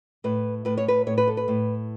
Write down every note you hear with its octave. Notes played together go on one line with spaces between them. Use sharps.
A2 B4
A2 B4
C#5
B4
A2 C#5
B4
A4
B4
A2